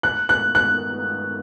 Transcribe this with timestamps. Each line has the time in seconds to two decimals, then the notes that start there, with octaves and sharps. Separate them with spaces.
0.03 F#6
0.29 F#6
0.55 F#6